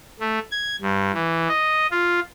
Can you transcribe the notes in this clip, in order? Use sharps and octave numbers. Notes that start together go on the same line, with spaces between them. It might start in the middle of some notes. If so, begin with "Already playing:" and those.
A3
G#6
G2
E3
D#5
F4